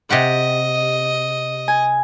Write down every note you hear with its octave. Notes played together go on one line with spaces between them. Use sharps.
C3 G4 D#5 F#5
G#5